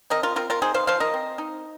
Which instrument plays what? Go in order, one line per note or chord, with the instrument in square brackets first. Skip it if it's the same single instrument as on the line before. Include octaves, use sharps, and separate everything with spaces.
[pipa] C4 A#4 D#5
F4 A#4
C4 F4 A#4
F4 A#4
D#4 G#4 C5
C5 F5
F3 C5 F5
A#4 D#5
C4
D#4